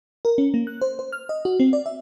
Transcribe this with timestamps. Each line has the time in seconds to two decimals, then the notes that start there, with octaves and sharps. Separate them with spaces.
0.25 A#4
0.38 C#4
0.54 A#3
0.67 F#6
0.81 C5
0.99 C5
1.12 F6
1.29 D#5
1.45 F#4
1.60 C4
1.73 D5
1.86 E5